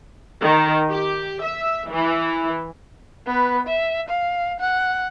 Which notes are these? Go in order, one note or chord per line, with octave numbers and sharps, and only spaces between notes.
D#3
G4
E5
E3
B3 B4
E5
F5
F#5